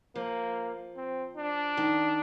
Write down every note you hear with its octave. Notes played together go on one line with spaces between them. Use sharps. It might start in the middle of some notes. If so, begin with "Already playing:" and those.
F3 A#3
C4
D4
D#3